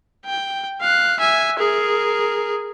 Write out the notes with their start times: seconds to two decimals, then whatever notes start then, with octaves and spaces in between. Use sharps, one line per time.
0.26 G5
0.81 F5 F#6
1.20 E5 G#5
1.59 G#4 A#4